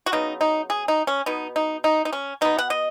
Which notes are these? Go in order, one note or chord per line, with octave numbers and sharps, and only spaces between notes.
F#4
C#3 F#3 B3 D#4
D#4
G#4
D#4
C#4
B2 B3 D#4
D#4
D#4
D#4
C#4
B2 B3 D#4
F#5
D#5